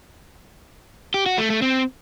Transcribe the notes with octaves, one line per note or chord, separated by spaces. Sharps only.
G4
F#4
A3
A3
C4